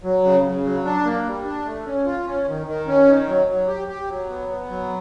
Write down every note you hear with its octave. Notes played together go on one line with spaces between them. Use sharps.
F#3
C#3
C#3
F#3
D4
A#3
G3
D4
A3
C#4
F4
C#4
D#3
D#3
C#4
D#3
F#3
F#3
G4
G4
F#3
B3
B3
F#3